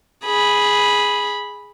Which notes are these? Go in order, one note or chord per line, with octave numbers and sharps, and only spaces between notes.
G#4 B5